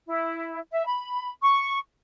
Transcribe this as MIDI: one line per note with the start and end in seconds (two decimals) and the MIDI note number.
0.08 0.60 64
0.72 0.84 76
0.86 1.31 83
1.42 1.79 85